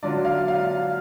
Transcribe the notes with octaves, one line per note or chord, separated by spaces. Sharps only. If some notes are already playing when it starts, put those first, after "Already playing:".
D3 F#3 D4 F4 D5
F5
F5